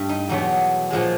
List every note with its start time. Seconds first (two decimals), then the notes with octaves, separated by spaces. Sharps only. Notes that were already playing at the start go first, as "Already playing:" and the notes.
Already playing: G2 A3
0.09 D#4
0.29 E2 B2 F#3 A3 D#4
0.91 A#2 F3 G#3